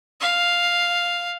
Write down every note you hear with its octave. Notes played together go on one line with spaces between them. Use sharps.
F5